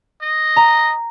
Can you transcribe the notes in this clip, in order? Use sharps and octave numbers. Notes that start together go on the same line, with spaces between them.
D#5
A#5